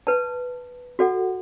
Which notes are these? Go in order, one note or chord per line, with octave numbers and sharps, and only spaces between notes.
B4 D5 A5
F#4 A4 D5 F#5